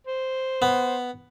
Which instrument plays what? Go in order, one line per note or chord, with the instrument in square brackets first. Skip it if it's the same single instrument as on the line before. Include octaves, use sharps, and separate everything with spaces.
[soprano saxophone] C5
[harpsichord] B3